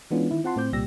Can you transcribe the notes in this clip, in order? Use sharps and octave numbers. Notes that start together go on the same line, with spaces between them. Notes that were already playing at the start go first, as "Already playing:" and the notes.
E3 G#3 B3 C#4 D4 F4
D#3 E4
C4 F4 F#5 A5 C6
A2 C4 C5 D6 G6
C2 A#2 G3 G4 E6 A#6